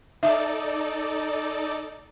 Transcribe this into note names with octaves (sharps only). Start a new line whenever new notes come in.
D#4 A4 D5 E5